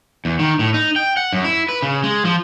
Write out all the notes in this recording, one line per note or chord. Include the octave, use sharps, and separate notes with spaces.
E2
D#3
A2
D#4
G5
F#5
F#2
E4
B4
C#3
G#3
F3